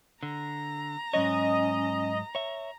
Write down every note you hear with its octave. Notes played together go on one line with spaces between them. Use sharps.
D3 A#5
G#2 F#3 C#4 C#5 D#5
C#5 E5